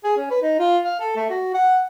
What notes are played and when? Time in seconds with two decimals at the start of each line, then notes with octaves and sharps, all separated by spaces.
0.04 G#4
0.17 C#4
0.30 B4
0.42 D#4
0.59 F4
0.85 F5
1.00 A4
1.16 A3
1.30 F#4
1.54 F#5